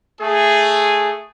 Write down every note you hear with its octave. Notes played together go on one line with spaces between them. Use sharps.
A3 G#4